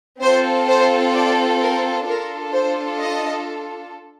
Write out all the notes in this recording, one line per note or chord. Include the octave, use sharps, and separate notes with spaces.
C4 F4 A4 C5
C5
D5
A#4
D4 F4 A4 A#4
C5
D#5